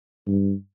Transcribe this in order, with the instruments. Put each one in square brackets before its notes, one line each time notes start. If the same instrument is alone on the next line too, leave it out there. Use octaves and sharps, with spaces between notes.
[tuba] G2